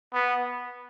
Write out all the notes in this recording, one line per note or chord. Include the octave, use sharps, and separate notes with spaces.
B3